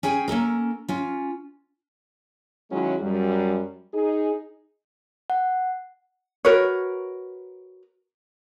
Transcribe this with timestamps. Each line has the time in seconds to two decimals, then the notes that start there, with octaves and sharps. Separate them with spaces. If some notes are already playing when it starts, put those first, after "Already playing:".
0.03 C#4 G#4 G5 G#5
0.28 A#3 C#4 A4 A#4
0.88 C#4 F4
2.71 D#3 F#3 G#3 C#4 E4
3.01 F#2 G3
3.94 D#4 G#4
5.30 F#5
6.45 F#4 A#4 B4 C#5